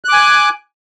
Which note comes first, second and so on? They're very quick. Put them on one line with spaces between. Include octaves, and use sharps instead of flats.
F#6 D6 G#5